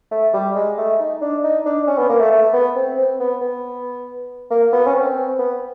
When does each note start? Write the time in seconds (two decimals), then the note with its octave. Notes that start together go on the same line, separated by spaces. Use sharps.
0.12 A3
0.33 G3
0.56 G#3
0.78 A3
1.00 D#4
1.22 D4
1.44 D#4
1.66 D4
1.87 C#4
1.98 B3
2.09 A#3
2.20 A3
2.31 A3
2.54 B3
2.76 C4
2.97 C4
3.20 B3
3.41 B3
4.51 A#3
4.73 B3
4.87 C#4
4.95 C4
5.39 B3